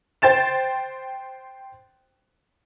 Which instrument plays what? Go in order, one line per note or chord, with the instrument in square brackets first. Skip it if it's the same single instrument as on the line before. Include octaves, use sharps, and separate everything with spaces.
[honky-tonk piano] C5 G5 A6 E7